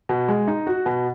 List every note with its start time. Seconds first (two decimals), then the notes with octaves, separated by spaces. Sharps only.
0.09 B2
0.28 G#3
0.47 D#4
0.67 F#4
0.86 B2